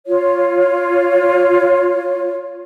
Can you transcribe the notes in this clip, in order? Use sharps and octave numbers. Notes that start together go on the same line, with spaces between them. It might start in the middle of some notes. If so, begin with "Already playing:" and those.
F4 C#5